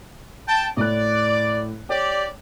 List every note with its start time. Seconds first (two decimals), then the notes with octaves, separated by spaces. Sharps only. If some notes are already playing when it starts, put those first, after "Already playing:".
0.47 G5 A5
0.77 A2 D5 F#6
1.89 G4 C#5 D5 G5